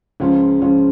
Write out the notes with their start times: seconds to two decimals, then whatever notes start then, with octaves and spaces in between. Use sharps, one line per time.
0.20 C#2 C#3 F3 C#4 F4
0.61 C#2 C#3 F3 C#4 F4